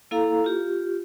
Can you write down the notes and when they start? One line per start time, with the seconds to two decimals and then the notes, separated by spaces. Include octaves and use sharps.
0.11 A#3 E4 A4 F5 A#5
0.44 F4 G4